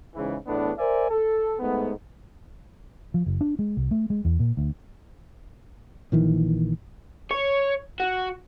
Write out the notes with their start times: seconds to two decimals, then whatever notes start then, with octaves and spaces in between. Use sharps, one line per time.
0.15 G#2 C#3 E3
0.47 E2 A2 B3 D4
0.78 A#4 C5 D5 E5 G#5
1.10 A4
1.59 G#2 A3 B3
3.14 F3
3.26 F#1
3.41 D4
3.59 G#3
3.77 C2
3.91 A3
4.10 G#3
4.25 E2
4.40 A#2
4.57 D2
6.12 A#1 D#3 E3
7.31 C#5
8.00 F#4